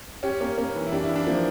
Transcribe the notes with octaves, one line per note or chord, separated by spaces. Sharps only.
C#4 G4
A#3 C#4
A#3 C#4
E3
E4
D4 G4
E4
E3
D4
F3 A#3